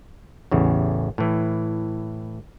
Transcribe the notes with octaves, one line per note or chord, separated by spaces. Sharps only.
A1 E2 C#3
A2 E3